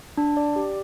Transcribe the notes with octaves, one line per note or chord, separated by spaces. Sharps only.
D4
D5
G4